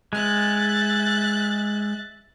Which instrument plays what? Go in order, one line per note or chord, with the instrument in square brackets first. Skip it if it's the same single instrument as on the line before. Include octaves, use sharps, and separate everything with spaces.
[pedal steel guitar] G#3 [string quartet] E5 F#6 A6